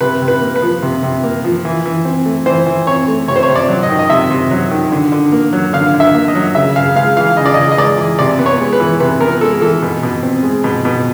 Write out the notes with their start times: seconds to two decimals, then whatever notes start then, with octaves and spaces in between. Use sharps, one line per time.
0.01 C3 B4
0.22 C3
0.28 B4
0.41 A#3
0.56 B4
0.62 F3
0.82 C3
1.03 C3
1.24 A#3
1.44 F3
1.65 E3
1.86 E3
2.05 C4
2.25 A3
2.46 E3 C5
2.66 E3
2.87 C4 C#5
3.08 A3
3.28 C3 C#5
3.36 C5
3.43 C#5
3.49 C3
3.56 D5
3.69 F#3
3.83 D#5
3.89 D#3
3.99 D#5
4.10 C3 E5
4.31 C3
4.51 F#3
4.71 D#3
4.92 D3
5.12 D3
5.32 A#3
5.53 F#3
5.73 D3 F5
5.94 D3
6.00 E5
6.14 A#3
6.28 D#5
6.35 F#3
6.55 C#3 E5
6.76 C#3 F5
6.96 G#3 F5
7.16 E3 F5
7.37 C#3 D#5
7.46 D5
7.54 C#3 D#5
7.72 D#5
7.77 G#3 D5
7.98 E3
8.19 C3 D5
8.39 B3
8.46 C#5
8.60 G#3
8.73 B4
8.80 E3
9.00 C3 B4
9.21 B3 A#4
9.41 G#3 A4
9.61 E3 A4
9.82 B2
10.03 B2
10.23 C4
10.43 G#3
10.64 B2
10.85 B2